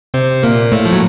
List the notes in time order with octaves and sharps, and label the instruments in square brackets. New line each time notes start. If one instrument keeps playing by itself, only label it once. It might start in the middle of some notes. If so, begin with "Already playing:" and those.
[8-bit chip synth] C3 C4
A#2 A#3
A2 A3
F3
F#3